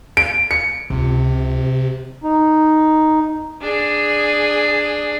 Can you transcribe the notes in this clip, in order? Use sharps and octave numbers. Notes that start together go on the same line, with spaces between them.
D7
C#7
C#2 C3 F4
D#4
D4 G#4